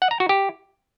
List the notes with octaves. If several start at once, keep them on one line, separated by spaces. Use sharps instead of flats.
F#5
A#5
F#4
G4